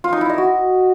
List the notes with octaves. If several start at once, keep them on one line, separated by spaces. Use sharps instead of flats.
F4
D#4
E4
D#5
F#4